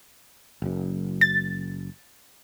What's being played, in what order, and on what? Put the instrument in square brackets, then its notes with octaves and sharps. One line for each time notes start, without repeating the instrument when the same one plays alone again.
[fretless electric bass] F#1 F#2
[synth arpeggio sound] A6